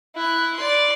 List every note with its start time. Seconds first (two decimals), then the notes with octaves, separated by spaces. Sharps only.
0.15 E4 F#6
0.56 D5 C6